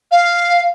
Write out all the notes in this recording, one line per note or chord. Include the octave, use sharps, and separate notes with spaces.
F5